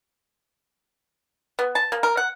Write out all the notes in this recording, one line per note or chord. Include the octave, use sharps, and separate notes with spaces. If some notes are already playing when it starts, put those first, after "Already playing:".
B3
A5
A#3
A#4
F#5